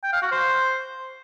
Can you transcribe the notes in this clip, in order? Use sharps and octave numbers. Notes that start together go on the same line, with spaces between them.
G5
F5
F#4
C5